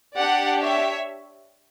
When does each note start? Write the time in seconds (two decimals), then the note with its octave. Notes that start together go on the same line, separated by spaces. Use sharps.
0.16 D4 G4 D5 F#5
0.62 C#5 E5